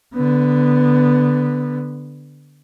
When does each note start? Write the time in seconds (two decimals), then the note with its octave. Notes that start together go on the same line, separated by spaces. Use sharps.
0.15 D3 B3